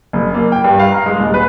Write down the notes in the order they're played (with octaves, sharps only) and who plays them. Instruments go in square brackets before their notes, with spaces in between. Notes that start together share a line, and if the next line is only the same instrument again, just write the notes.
[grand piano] F#1
A#3
G5
G2
F5
A#5
G#3
D#1
B4